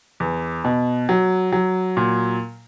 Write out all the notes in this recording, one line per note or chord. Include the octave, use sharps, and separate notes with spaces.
E2
B2
F#3
F#3
A#2